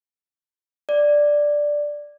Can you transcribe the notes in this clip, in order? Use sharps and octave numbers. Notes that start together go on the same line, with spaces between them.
D5